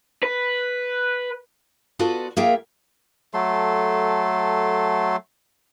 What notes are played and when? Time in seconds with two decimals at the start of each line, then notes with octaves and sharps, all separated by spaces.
0.23 B4
1.99 B3 F4 F#4 A4 B4 D5
2.37 A#3 F4 G#4 A#4 E5 G5
3.34 F#3 A3 A4 C6